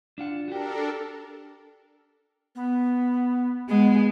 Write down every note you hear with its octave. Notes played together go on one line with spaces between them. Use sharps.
D4 F4 F#5
D4 F#4 G4 A4 A#4
B3
G#3 B3